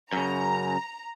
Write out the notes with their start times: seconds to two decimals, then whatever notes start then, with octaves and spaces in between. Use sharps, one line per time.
0.13 F#2 C#3 A#5